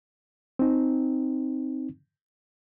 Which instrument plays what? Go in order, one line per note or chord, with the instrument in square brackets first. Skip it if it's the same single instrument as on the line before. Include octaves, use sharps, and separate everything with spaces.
[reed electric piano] C4 D#4